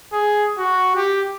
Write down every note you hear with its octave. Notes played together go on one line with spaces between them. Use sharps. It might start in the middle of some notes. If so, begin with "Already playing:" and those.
G#4
F#4
G4